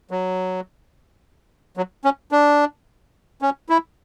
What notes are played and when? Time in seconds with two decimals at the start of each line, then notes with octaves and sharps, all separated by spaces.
0.11 F#3
1.77 F#3
2.05 C#4
2.32 D4
3.42 C#4
3.69 E4